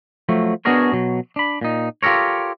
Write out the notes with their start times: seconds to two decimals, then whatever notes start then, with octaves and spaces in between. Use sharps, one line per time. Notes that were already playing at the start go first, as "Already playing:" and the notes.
0.29 F3 F#3 A3
0.65 B3 D4 F#4 G#4 A#4 C#5
0.92 B2 F#3
1.36 D4 B5
1.61 A#2 D#4
2.03 F4 G4 A4 A#4 C#5